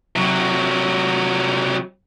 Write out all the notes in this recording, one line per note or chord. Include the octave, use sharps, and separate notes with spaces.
C3 F#3